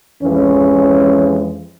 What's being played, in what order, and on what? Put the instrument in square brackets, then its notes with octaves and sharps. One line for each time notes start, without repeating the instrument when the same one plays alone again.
[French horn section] F2 E3 G#3 C#4